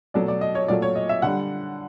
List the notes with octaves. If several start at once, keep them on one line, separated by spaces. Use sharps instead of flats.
B2 F#3 A3 D5
D5
D#5
C#5
A#2 F#3 A3 D5
C#5
D#5
E5
D3 G3 F#5